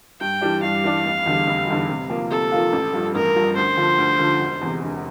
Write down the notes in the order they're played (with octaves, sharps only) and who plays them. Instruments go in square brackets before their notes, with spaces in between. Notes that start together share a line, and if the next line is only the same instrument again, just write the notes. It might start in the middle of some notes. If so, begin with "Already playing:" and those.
[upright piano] G2 [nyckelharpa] G5
[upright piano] E3 G3 D4
[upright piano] G2 [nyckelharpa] F5
[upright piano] E3 G3 D4
F1
E2 D3 G3
F1
E2 D3 G3
C3
F3 A#3 F4
[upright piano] C3 [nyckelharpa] A4
[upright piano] F3 A#3 F4
A1
G2 F3
[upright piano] A1 [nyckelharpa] A#4
[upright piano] G2 F3
[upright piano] D2 [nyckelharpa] C5
[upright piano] D3 F3
D2
D3 F3
E1
E2 C3
E1